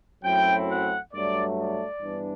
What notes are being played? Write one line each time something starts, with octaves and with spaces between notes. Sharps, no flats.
F#2 F#3 A3 C4 E4 G5
F#5
G2 F#3 A3 D5
D5
G2 E3 B3 D4